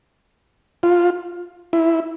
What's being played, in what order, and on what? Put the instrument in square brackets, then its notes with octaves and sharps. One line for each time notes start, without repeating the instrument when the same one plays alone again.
[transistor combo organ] F4
E4